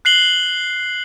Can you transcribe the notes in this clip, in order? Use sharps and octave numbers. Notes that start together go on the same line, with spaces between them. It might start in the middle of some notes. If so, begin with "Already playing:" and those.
F#6 C7 F#7 G7